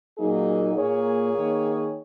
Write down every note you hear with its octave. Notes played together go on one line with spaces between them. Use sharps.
A#2 F#3 A#3 D#4 G#4
A#2 A#3 G#4 C#5
D#3 A#3